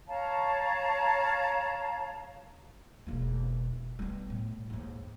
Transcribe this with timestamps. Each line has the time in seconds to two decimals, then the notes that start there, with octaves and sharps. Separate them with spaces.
0.07 C#5 F5 A5 A#5
3.07 E1 A#3
3.99 G3 B3
4.30 A2
4.70 D#2 G#2